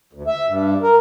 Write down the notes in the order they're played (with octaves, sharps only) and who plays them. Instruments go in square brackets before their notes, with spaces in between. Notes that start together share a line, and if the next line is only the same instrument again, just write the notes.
[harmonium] D2
E5
G2
A#4